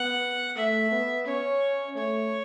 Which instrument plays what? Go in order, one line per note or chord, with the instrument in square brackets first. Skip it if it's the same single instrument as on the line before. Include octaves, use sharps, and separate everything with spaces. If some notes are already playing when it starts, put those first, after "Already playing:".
Already playing: [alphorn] B3 [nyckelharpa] F#5
[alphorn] A3 [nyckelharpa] E5
[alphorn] B3
[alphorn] C#4 [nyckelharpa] C#5
[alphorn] A3 [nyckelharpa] C#5